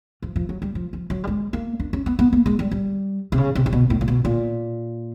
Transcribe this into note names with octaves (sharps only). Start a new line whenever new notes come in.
F3
F3
F#3
G3
F3
F3
F#3
G3
G#3
A#3
D4
C#4
B3
B3
A#3
G#3
G3
G3
C3
C#3
C3
C3
B2
A2
A#2
B2
A#2